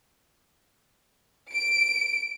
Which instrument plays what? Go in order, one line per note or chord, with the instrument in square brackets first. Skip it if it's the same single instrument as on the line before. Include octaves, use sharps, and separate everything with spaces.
[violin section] D7